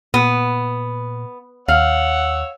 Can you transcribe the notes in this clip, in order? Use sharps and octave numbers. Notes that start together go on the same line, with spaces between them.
A#2 B3
D#2 C#5 F5 F#5 E6